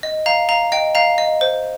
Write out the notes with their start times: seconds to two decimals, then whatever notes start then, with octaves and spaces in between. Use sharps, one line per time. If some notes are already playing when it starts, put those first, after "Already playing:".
0.03 D#5
0.26 F5 A#5
0.49 F5 A#5
0.72 D#5 G5
0.95 F5 A#5
1.18 D#5
1.41 C5